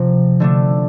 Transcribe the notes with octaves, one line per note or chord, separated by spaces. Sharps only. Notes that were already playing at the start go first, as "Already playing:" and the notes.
Already playing: C3 F3 C4
D3 A3 D4